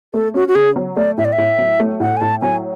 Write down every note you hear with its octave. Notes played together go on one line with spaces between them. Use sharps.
A3 A4
C#4 F#4
F#4
C#3 G#4
F#3
A3 D5
A2 E5
D5
E5
A2
F#3
A3
A2 F#5
G#5
A2 A5
F#3 G#5